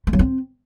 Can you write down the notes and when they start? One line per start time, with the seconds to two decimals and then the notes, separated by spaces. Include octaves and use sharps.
0.07 A3
0.13 F#3
0.19 C4